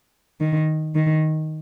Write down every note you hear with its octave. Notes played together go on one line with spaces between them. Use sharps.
D#3
D#3